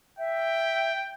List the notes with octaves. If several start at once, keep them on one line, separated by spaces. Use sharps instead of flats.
E5 G5